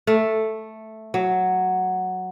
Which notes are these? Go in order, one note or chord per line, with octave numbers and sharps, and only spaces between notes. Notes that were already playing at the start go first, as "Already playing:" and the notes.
A3
F#3